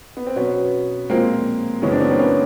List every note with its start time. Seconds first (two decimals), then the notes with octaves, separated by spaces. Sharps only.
0.17 B3
0.27 C4
0.36 B2 F#3 B3 C#4
1.10 A#2 F3 G#3 A#3 C4
1.82 F#2 C#3 E3 G#3 B3 C#4
1.91 C4 D4
2.01 B3 C#4
2.10 A#3 C4
2.19 B3 C#4